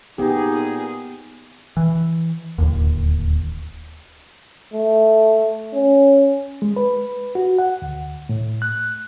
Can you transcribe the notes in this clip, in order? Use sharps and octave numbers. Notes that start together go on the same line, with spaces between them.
A#2 B3 D#4 G4 G#4
E3
D1 D#2
A3
C#4
G#3
B4
F#4
F#5
D2
A2
F#6